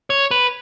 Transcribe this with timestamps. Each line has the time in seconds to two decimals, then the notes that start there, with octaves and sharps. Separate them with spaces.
0.10 C#5
0.31 B4